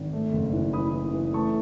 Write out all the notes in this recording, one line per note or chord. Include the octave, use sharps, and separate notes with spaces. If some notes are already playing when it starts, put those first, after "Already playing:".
Already playing: G#1
A3
F#1
E3
E3 B5 D#6
E3
E3
A3 A5 C#6